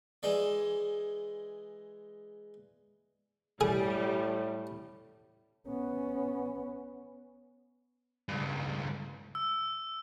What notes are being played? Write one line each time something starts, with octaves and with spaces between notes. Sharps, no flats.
E3 G#3 D5
A2 G3 G#4
B3 C#4
C#2 G2
E6